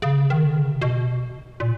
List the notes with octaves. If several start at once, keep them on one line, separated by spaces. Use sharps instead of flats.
C#3
D#3
D3
C#3
C3
B2
A#2